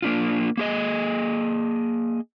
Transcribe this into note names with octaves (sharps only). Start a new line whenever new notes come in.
A#3 D4 F4
A#3 G#4 D#5